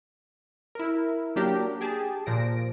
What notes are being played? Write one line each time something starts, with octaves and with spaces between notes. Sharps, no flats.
E4 A#4
F#3 A#3 D4 G4 A#4
G4 G#4 A5
A#2 F3 A#6 D7